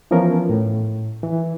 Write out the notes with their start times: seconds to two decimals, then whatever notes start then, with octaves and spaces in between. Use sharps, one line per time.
0.11 E3 F3 B3 C#4 A#4
0.49 A2
1.23 E3